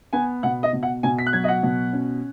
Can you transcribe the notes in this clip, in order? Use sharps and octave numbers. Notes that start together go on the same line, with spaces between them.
B3 G#5
B2 F#5
D#5
B2
F#5
B2 G#5
B6
F#6
F#3 G#6
D#5
F#5
B2
C#4